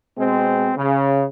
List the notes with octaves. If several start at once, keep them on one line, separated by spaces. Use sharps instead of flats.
B2 G#3 C4
C#3